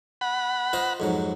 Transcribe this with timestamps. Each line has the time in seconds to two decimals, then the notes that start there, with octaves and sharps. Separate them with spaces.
0.21 F#5 B5
0.73 F4 C5 D#5
1.00 F2 G#2 F#3